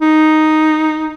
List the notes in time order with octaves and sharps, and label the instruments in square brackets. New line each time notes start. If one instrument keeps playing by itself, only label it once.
[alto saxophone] D#4